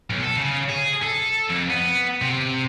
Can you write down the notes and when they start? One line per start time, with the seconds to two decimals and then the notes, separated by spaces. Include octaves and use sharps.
0.10 B1
0.22 A4
0.37 C#3
0.69 G#4
1.03 A4
1.50 F2
1.70 B3
2.22 C3